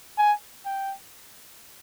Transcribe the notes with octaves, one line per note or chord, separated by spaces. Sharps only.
G#5
G5